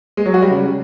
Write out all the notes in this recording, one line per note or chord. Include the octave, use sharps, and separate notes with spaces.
G#3
F#3
F#4
G3
C#3